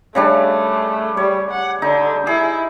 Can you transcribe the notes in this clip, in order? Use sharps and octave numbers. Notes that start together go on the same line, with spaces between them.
C#3 G3 A3 D4
G3 C#5
F#5
D3 D#4
E4 G#4